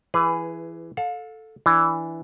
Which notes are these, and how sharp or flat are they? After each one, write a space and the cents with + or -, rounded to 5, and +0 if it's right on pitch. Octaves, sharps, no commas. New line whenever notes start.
E3 +15 G#4 +0 B4 +0
A4 +0 F5 +35
E3 +0 D4 +0